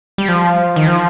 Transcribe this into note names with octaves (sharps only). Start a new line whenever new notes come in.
G3
F3
D#3
F3